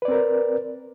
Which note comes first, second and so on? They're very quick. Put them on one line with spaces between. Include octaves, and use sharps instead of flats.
B4 D5 C4 A#4